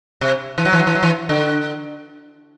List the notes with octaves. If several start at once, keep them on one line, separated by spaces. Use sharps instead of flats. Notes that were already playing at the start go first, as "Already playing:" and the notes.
C3
E3
F#3
E3
F#3
E3
F#3
E3
D3